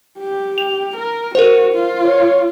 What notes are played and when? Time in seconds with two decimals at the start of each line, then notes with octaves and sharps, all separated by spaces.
0.19 G4
0.58 F7
0.97 A#4
1.35 F#4 A#4 C5
1.74 F4
2.05 C#5